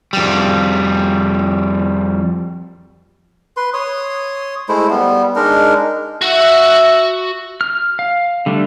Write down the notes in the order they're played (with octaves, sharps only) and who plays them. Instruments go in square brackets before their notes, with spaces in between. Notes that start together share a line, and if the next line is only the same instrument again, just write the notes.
[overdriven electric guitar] F2 G3
[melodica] B4 C6
C#5 C6 D#6
G#3 A3 E4 C5
G3 B3
G#3 D4 D#4 A#4
[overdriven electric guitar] F#4 F#5 [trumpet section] E5
[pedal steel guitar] F6
F5
D3 G3 A3 D4